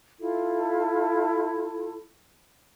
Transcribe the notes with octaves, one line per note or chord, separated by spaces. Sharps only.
E4 F4 A4